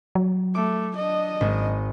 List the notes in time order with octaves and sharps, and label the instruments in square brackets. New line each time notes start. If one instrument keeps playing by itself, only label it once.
[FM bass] F#3
[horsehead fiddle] A3 [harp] D6
[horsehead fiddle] D4 D#5
[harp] G#1